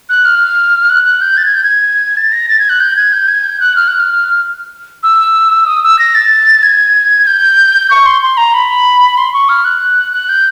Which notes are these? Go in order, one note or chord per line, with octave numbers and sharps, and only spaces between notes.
F#6
F6
F#6
F#6
G6
A6
G#6
G6
G#6
A6
A#6
A6
G#6
F#6
G6
G#6
G6
G#6
G6
F#6
F6
F#6
F6
E6
D#6
E6
A#6
A6
G#6
G6
C#6
C6
C6
A#5
B5
C6
C#6
F6
F#6
F#6
G6